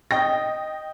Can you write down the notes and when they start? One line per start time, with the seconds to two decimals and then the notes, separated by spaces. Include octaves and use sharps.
0.11 D#5 G5 A#6